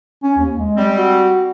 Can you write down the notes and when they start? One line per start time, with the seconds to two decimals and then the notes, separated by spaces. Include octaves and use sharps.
0.23 C#4
0.38 D#2
0.57 G#3
0.77 G3 C4
0.97 F#4